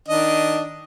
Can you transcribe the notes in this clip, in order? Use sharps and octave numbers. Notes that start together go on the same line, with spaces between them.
D#3 D4 D#5